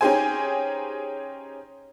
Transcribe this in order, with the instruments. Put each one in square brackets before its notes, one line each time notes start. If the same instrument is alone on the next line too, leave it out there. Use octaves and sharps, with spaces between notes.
[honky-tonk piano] C#4 D#4 G4 G#4 C5 G#5